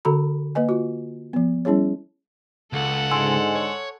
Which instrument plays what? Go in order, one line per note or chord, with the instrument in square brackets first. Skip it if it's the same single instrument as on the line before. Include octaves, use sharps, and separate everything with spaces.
[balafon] D3 F#4 A4 A#5 B5
A#3 B4 D#5 G#5
F4 F#4
F3 B3
G3 C#4 E4 G#4 C#5
[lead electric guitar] C#2 [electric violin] A4 F#5
[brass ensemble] G#2 D3 G#3 [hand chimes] G#5 C6 E6
[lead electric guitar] C#5